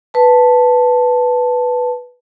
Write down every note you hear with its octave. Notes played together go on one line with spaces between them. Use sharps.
B4 A5